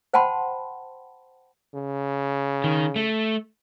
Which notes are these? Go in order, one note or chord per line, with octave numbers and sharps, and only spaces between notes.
C5 F#5 G5 A5 B5 C6
C#3
D#3
A3